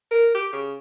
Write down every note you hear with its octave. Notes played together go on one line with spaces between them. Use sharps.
A#4
G4
C#3